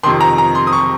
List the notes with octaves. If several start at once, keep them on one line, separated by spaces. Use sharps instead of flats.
F2 C3 D#3 C6
A#5
A#5
C6
D#6
C#6